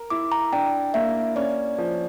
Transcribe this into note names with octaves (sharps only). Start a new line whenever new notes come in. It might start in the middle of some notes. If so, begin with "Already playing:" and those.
Already playing: A#4
E4 D6
A#5
D4 G5
A#3 E5
C#4 D5
F3